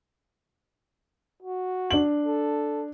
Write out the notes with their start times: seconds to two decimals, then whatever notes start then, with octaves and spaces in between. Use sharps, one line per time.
1.43 F#4
1.91 D4 F#7
2.26 A4